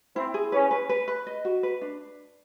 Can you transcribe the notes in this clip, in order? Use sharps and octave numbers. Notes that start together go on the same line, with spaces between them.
C4 E4
G#4
C#4 B4
B4
B4
B4
D#5
F#4
B4
D4